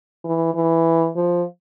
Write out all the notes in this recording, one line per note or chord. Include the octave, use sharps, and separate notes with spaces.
E3
E3
F3